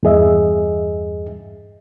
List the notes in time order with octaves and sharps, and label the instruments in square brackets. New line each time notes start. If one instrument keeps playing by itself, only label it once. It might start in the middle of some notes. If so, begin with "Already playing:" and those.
[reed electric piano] E2 G2 G#4 D#5 E5